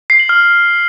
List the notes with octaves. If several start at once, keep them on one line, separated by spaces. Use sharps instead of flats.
C7
F#7
F6